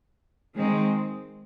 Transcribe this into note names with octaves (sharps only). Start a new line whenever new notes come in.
D#3 G#3 C4